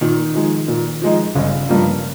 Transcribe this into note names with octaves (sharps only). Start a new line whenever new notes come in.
A#2 D#3
F3 G#3 D#4
A#2
F3 G#3 D#4
G1 C#3
G2 F3 A#3